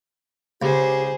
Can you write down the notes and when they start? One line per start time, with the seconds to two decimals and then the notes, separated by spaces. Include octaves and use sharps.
0.62 C#2 G4 G#4 C5